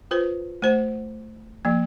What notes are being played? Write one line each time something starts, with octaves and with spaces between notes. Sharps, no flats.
F4 B4 C5
A3 C5 F#5
F3 A#3